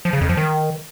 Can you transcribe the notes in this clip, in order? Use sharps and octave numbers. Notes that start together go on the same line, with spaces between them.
F3
C#3
F2
F3
D#3